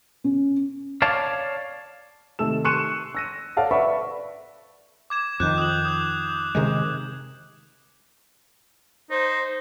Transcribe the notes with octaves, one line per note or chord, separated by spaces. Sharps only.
C#4
C#5 D5 F5 A5
C3 D#3 A3 A4 E6 E7
C6 C#6 F#6 C#7 D#7 E7
E6 A#6 D#7
A4 C#5 D5 F5 F#5 A5
B4 D5 E5 B5 C#6
D6 G#6 E7
F2 D#3 F#6 G6
D#6 F#7
D#6 G6
C3 D#3 G#3
D#4 C5